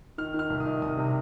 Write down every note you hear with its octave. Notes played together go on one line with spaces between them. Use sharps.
D#3 F6
D#3 F6
C2
D#6
D#3
C2 D#6
C3